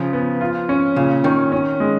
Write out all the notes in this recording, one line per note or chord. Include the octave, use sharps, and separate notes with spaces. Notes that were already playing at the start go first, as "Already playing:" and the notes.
Already playing: C#3 F3
B3
F4
C#4
A#2 C#3
D#3 C#4
C#4
G#3